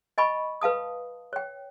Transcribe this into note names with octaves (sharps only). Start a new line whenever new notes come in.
D#5 G#5 B5 C#6
B4 F5 A5 D#6
C#5 G5